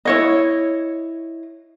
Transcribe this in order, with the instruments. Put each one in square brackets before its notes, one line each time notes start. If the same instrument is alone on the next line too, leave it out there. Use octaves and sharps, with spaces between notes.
[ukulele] E4 C#5 D#5